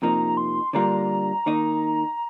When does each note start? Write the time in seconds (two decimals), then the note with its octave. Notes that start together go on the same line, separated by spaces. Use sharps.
0.02 F2 C3 F3 A#3 D#4 A#5
0.37 C6
0.73 D3 G3 A#3 D4 F4 A#5
1.46 D#3 A#3 D#4